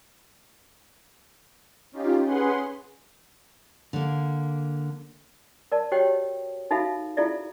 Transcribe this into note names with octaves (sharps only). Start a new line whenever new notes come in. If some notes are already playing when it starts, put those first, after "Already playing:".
C#4 D#4 F4 G4
C#4 G#4 B4 F#5 C6
D3 A#3
A#4 D5 A5
F#4 G4 C5 C#5 D#5 G5
D#4 F#4 A4 E5 F5 B5
E4 F4 G#4 A4 D5 E5